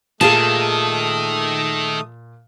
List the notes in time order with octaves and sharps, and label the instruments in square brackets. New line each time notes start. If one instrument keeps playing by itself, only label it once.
[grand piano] A#2 [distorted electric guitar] D#3 [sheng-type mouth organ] A3 D#6 [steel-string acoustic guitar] G#4 F5 A5